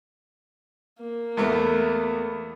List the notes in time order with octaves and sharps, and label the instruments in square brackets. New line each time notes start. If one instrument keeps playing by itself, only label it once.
[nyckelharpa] A#3
[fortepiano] E2 A3 B3